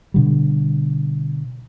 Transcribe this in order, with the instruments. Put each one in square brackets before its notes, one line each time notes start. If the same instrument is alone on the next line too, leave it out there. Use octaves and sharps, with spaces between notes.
[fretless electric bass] B2 D3 G3